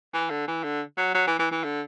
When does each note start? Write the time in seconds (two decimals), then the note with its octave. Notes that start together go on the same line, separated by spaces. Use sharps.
0.14 E3
0.30 D3
0.48 E3
0.64 D3
0.97 F#3
1.14 F#3
1.27 E3
1.39 E3
1.51 E3
1.64 D3